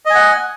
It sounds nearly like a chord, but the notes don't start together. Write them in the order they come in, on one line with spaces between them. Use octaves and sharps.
D#5 G#5 F#5